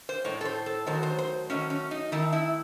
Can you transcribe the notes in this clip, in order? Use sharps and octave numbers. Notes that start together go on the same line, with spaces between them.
C5
A2 G#3 C#5
A4
C5
A4
D#3 F#3 A3 C5
C5
C5
D#3 F#3 A3 C#4
C#4
D#4
D#3 A3 E4
E4